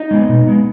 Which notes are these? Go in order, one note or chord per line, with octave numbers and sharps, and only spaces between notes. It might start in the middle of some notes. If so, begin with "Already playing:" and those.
Already playing: D#4 D#5
G#3 B3
B2
G#3 B3